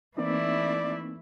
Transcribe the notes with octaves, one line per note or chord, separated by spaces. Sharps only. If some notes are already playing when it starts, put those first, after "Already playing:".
E3 A3 A#3 C4 D#4 E4 D5